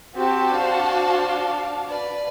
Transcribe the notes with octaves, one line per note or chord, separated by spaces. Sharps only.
C4 F#4 G4 A5
D4 C5 F5
B4 D5